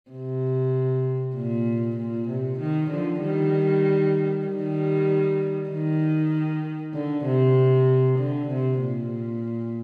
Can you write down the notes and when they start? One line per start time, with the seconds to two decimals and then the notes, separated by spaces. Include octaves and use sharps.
0.11 C3
1.35 A#2
1.97 A#2
2.29 C3
2.59 D#3
2.90 D3 F3
3.21 D#3 G3
4.46 D#3 G3
5.70 D#3
6.94 D3
7.25 C3
8.19 D3
8.49 C3
8.80 A#2